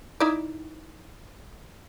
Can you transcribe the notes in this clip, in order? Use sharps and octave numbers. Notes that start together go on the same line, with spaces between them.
D#4 E4 D5